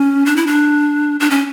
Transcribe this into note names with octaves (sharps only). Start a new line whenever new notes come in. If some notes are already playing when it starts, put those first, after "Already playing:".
Already playing: C#4
D4
E4
D4
D4
C#4